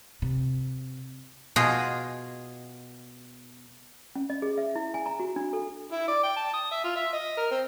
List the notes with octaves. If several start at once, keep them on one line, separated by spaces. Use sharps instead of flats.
C3
B2 F4 G#4 D#5
C#4
D#5
G#4
E5
E4
G#5
A#5
F#4
D4
A4
E4
D5
G5
A5
D#6
E5
F4
E5
D#5
A#4
C4